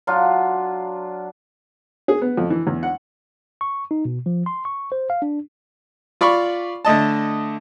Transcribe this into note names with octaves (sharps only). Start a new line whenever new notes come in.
F#3 D4 F4
G#4
B3
F2
E3
E2
F#5
C#6
D#4
B2
F3
C6
C#6
C5
F5
D4
F4 D5 B5 C#6
D3 A3 D#5 A5